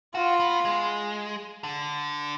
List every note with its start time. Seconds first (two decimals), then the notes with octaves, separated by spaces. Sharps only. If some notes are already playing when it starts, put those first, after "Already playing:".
0.15 F4 F#4
0.40 B3
0.65 G#3
1.64 D3